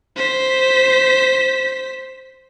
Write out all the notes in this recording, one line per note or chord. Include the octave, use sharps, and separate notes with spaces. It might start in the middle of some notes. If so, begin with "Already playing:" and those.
C5 B6